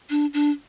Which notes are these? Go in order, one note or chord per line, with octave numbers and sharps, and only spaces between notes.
D4
D4